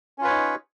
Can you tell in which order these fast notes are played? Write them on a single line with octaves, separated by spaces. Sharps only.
C#4 F4 B4 C#5 D#4